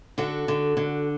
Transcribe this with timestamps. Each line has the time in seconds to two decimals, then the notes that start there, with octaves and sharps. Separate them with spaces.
0.18 D3 F#4 A4
0.48 D3
0.77 D3